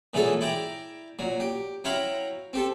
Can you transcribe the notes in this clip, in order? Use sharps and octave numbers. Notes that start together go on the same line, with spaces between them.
A#2 E3 F#3 G#3 E4 A4
E4 D5 G5 A#5
A#2 F#3
G4
F#3 E4 F5 G5 A#5 B5
C4 G4 A4